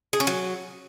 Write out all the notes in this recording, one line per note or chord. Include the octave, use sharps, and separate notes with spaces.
G#4
C#4
F#3